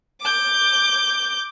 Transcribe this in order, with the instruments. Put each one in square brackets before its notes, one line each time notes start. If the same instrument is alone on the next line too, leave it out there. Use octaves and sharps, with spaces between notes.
[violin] D6 G6